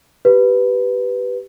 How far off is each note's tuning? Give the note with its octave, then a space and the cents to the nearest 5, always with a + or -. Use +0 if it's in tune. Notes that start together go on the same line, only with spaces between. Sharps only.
G4 -10 B4 +0